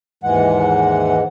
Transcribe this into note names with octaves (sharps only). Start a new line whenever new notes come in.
D#2 G#2 E3 G#3 F#5